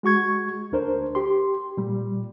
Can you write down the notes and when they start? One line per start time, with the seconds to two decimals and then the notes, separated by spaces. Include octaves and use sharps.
0.03 G#3 F#4 C#6 G#6
0.72 D2 D4 A#4 C5
1.15 G4 C6
1.77 A#2 G3